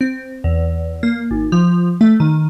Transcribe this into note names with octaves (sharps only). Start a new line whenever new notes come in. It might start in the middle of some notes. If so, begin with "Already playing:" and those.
C4
E2
A#3
G#1
F3
A3
D#3